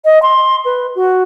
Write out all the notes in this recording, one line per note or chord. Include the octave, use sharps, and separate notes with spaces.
D#5
C6
B4
F#4